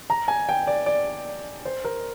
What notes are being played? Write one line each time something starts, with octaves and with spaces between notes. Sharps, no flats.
A#5
G#5
G5
D5
D5
C5
A#4